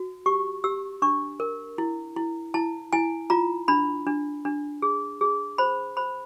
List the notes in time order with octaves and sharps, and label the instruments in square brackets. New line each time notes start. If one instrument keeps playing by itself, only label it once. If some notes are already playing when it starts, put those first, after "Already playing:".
Already playing: [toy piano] F#4
G4 C#6
G4 E6
D4 C#6
A#4
E4
E4
E4 A5
E4 G#5
F4 A#5
D4 B5
D4
D4
G#4
G#4
C5 B5
C5 B5